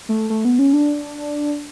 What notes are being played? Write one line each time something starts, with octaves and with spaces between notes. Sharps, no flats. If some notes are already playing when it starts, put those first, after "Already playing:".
A3
A3
B3
C#4
D4